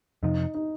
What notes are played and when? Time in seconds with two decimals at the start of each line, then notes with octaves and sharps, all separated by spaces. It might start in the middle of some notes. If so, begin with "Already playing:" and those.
0.23 F2 C3 F3 D#4
0.55 D#4